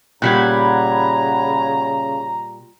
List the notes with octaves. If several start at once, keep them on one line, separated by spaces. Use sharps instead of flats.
A#2 C#3 G3 F#5 A#5 B5 G#6